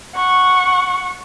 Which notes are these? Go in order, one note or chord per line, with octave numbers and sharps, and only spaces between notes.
F#5 C#6